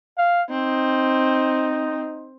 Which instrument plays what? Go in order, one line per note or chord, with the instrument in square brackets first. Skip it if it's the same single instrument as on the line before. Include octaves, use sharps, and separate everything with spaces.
[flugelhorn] F5
[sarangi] C4 [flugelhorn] D#4